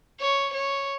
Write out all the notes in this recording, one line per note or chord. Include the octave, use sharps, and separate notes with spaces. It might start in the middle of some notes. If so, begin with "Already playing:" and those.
C#5
C#5